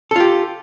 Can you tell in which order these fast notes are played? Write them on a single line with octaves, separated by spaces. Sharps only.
A4 F4 G4